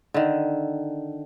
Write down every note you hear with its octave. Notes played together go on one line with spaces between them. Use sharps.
D3 D#3